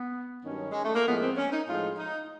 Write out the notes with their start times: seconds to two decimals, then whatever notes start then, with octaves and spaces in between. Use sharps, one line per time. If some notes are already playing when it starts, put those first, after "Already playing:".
Already playing: B3
0.44 G2 D#3 F#3 C#4
0.72 G#3
0.84 A3
0.95 A#3
1.06 A2 F3 G#3 B3
1.21 C4
1.37 C#4
1.52 D#4
1.68 A2 F3 G#3 F4
1.98 D#4